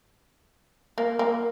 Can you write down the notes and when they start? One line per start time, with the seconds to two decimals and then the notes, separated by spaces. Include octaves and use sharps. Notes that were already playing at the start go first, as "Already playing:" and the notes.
0.98 A#3
1.19 A#3